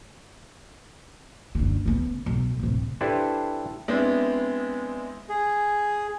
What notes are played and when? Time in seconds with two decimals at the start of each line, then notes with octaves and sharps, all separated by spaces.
1.55 F#1 D3
1.86 C#3 B3
2.26 B1
2.59 D1 C3
3.01 D4 E4 G4 A4 B4 C5
3.88 G#3 B3 C4 D4 E4
5.29 G#4